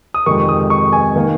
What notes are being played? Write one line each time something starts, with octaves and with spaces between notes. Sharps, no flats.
D#6
F2 C3 D#3 G#3 C#6
D#6
C#6
G#5
D#3 A#3 D#4